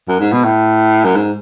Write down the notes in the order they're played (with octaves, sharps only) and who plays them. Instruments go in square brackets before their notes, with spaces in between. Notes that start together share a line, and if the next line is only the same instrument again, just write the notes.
[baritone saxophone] F#2
G#2
B2
A2
F#2
G#2